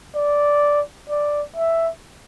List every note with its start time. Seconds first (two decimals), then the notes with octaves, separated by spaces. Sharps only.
0.15 D5
1.09 D5
1.56 E5